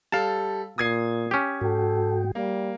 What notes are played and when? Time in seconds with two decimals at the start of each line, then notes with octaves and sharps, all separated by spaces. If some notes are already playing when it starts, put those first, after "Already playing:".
0.12 G3 A4 F5 A5
0.78 A#2 D#6 G#6 C7
1.31 C#4 G4
1.61 G#2 F#4 A4 G5
2.35 G3 A#3